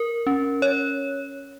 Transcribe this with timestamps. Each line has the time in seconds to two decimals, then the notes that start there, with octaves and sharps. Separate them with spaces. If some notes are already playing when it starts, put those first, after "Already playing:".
Already playing: A#4
0.27 C#4
0.62 C#5